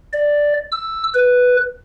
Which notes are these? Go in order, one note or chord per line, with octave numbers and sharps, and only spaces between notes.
D5
E6
B4